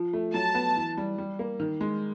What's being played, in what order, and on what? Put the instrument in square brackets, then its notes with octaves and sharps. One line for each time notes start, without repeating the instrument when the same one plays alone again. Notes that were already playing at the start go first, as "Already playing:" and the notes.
Already playing: [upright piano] F3
A3
[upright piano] F#3 [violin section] A5
[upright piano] B3
E3
G3
G3
A#3
D#3
G#3